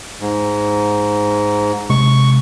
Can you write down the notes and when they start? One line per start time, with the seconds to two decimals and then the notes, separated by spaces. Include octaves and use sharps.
0.20 G#2
1.90 C3 G#3 C#6